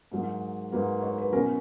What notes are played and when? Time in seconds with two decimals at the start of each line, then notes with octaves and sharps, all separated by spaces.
0.12 G#2 F#3 A#3
0.72 G#2 F#3 A#3 B4
1.02 C#5
1.18 B4
1.32 B2 F#3 C#4 E4 A#4